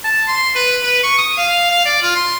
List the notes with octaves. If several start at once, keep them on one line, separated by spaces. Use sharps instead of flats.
A5
C6
B4
B4
C#6
D#6
F5
F5
D5
F4
C6